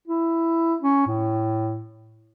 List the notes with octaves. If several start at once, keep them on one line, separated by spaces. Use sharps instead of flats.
E4
C#4
A2